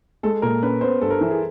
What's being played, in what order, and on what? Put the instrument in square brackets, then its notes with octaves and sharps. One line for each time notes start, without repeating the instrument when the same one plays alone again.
[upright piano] G#3 [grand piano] A4
[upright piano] A#2 [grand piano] A#4
[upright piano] C#4 [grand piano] B4
[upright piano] B3 [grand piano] C5
[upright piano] G2 [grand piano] A4
[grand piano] A#4
[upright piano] E3
[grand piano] G#4